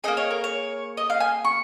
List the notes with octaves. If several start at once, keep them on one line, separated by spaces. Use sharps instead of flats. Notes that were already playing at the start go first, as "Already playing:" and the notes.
A#3 D#4 G#4 D#5
C#5
A#4
C#5
D#5
F5
G#5
C#6